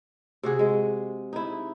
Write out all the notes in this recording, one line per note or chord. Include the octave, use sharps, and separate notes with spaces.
C3 F#4 G#4
G#3
D#4 E4